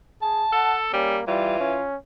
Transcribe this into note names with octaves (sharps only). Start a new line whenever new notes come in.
G#4 A5
A4 F#5
G3 A#3 C#4
E3 G3 F4
C#4